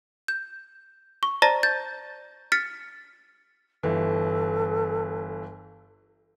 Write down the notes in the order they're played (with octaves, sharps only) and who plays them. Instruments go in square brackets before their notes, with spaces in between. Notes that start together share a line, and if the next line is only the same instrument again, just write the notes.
[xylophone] G6
C#6
C5 D5 A5 A#5 A6 A#6
G6 A6
F6 A6 B6 C#7
[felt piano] G1 E3 [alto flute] A4